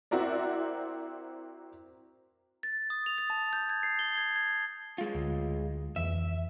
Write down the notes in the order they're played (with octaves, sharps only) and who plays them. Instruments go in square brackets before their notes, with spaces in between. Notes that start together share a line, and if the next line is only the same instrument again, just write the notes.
[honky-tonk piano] C4 E4 F#4 A#4 D5
[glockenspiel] A6
D#6
F7
A6
A5
G6
G#6
C7
G7
G#6
G#6
[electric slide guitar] G#3 F4
[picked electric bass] D2
[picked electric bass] F2 E3 [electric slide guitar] E5